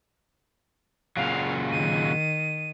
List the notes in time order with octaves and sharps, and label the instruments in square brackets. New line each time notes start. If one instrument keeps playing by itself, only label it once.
[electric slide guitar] A#2 C#3 F#3 [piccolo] F5
[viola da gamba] D#3 [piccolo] D#7